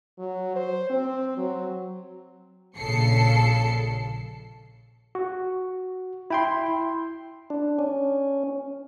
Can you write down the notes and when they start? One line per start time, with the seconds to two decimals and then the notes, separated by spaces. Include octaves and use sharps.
0.18 F#3
0.56 C5
0.90 C4
1.37 F#3
2.77 A#1 C#3 A4 C7 C#7
5.15 F#4
6.30 E4 G5 C6
7.50 D4
7.79 C#4